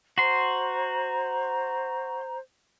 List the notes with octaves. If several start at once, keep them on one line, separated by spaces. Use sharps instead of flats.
F#4 C5 A#5 C6